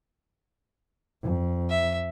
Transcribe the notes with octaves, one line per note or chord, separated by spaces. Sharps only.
F2
E5